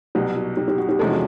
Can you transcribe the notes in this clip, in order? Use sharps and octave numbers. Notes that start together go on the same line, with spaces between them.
C2 B2 F#3 G4
F#4
G4
G4
F#4
G4
E2 C3 F3 G#3 C#4 A4
F#4